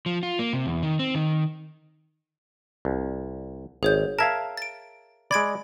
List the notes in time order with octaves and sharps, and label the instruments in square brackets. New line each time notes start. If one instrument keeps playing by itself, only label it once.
[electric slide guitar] F3
F4
A#3
C3
E2
D#3
C4
D#3
[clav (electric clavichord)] C2
[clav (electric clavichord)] G#1 [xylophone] G#4 C#5 G6
[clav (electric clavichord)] A#4 E5 F5 [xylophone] A5 G#6
[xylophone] A6 D7
[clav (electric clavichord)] G#3 D5 [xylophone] B5 G#6 D7